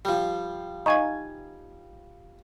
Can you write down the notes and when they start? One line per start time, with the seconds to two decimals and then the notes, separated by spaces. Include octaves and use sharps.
0.05 F3 G3
0.86 D#4 F5 G#5 A#5 C#6 G#6